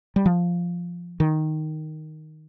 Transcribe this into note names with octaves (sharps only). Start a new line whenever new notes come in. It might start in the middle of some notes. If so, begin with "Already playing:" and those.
G3
F3
D#3